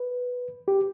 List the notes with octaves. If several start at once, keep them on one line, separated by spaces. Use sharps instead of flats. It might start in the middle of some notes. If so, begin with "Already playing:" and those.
Already playing: B4
G4